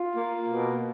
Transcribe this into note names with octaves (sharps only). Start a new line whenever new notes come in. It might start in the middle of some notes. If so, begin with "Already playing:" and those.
Already playing: F4
A#3
B2